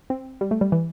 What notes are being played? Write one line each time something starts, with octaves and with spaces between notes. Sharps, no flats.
C4
G3
A3
G3
E3